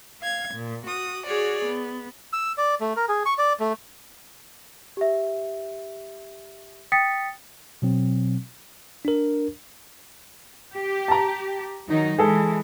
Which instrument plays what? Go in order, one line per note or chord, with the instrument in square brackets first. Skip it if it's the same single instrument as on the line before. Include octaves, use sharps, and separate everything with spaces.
[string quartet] F5 G#6
A#2
F#4 D#6
F#4 G#4 C#5 D5
B3
[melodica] E6
D5
A3
A#4
G#4
C#6
D5
A3
[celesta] G4 E5
G5 D#6 A6 B6 C#7
[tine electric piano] B2 F#3 C4
D4 A#4
[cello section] G4
[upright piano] A5 A#5
[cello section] D#3 F#3 D#4
[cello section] E3 G#3 [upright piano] G#4 A4